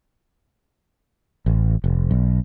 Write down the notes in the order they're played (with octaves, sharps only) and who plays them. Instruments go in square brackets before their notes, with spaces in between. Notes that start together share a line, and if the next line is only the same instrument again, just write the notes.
[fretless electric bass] A1
F1
B1